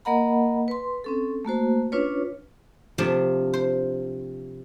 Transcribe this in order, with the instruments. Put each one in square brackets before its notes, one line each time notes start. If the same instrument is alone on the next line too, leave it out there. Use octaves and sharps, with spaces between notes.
[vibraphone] A#3 A#4 D#5 F#5 A#5 B5
B4 C6
C4 C#4 A4
A3 A#3 F#4 C5
C#4 D4 F4 B4 C#5
[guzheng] C3 F3 A3 D4
C5